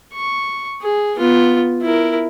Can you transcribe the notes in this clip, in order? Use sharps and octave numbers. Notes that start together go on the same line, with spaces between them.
C#6
G#4
B3 F4
E4 A#4